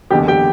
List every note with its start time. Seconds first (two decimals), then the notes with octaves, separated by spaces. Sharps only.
0.10 F#1 E2 D3 G4 G5
0.28 G4 G5